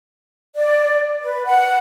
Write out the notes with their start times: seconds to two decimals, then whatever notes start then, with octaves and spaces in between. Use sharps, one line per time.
0.56 D5
1.22 B4
1.45 F#5